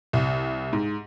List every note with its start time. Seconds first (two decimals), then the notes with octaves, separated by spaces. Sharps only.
0.13 C2
0.73 G#2